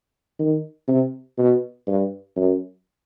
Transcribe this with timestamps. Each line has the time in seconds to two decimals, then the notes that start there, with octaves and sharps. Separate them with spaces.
0.39 D#3
0.88 C3
1.38 B2
1.87 G2
2.36 F#2